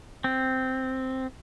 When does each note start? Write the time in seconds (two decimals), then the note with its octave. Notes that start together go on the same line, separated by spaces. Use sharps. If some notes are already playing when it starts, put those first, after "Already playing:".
0.24 C4